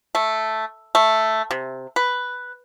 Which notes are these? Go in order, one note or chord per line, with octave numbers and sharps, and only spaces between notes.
A3
A3
C3
B4